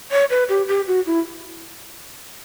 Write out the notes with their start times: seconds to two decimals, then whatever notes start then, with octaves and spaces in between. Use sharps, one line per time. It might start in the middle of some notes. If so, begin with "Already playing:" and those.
0.12 C#5
0.30 B4
0.49 G4
0.68 G4
0.87 F#4
1.06 E4